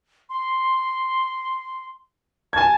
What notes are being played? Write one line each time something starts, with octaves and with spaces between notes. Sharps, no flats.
C6
G#5 A5 G#6